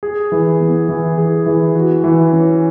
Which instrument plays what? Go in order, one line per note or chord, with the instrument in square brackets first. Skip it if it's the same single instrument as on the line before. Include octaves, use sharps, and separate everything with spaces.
[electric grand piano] G#4
E3
B3
E3
G#4
E3
F#4
E3
C#4